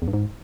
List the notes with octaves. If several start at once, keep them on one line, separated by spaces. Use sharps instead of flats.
E2
G2
G#2